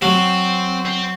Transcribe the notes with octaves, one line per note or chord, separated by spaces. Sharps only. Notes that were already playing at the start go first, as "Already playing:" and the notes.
F#3 C4
C4